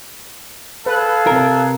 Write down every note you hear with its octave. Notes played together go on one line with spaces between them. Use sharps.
G#4 A4 B4 F5 F#6
C3 A#4